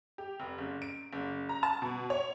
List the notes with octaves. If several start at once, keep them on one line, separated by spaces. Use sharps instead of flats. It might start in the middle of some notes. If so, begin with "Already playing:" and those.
G4
F1
F#1
D7
F#1
A#5
A5
B2
C#5